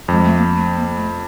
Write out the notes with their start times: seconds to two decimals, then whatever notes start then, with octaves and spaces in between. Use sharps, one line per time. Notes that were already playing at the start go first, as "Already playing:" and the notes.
0.08 F2 G#3
0.24 A3
0.36 A#3
0.55 A3
0.76 A#3
0.96 A3